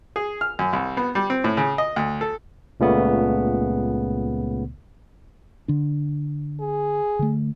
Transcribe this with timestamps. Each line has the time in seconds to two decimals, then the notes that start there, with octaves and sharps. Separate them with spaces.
0.16 G#4
0.41 F6
0.59 F#2
0.73 C2
0.97 B3
1.15 G3
1.30 C4
1.44 A2
1.57 C#3
1.78 D#5
1.96 D2
2.21 A4
2.80 C#2 A#2 C#3 A3 B3
5.68 D3 D4
6.60 G#4
7.19 D3 A3